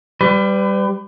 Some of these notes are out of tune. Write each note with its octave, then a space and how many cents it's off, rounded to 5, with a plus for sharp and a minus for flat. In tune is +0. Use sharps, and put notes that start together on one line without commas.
G3 +0 B4 +35